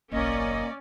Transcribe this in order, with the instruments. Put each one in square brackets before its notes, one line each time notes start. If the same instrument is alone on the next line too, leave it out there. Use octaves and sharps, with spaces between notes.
[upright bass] F#1 B1 [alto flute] A#3 [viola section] C#4 D5 [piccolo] D#5